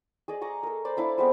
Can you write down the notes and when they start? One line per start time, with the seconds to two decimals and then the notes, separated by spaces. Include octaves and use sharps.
0.28 G#4 D5 D#5
0.41 D#5 A#5 C#6 D6
0.63 A4 A#4
0.85 C5 D5 B5 C6
0.97 D4 E4 F5
1.18 F3 G#3 B3 C4